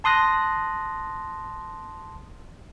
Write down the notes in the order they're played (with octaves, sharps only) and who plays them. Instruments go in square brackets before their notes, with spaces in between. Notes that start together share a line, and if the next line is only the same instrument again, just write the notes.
[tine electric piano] A5 C6 D#6 F#6 A#6